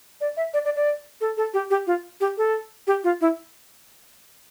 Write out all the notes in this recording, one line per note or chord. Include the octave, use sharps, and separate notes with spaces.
D5
E5
D5
D5
D5
A4
A4
G4
G4
F4
G4
A4
G4
F4
E4